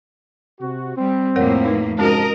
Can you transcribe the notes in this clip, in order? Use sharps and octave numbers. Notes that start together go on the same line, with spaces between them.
C3 F#4
G3 C4
F2 A2 A#3 A#4 C#5 F#5
D#4 B4
G#2 C3 G#3 C#4 F#4 A#4 D#5 A5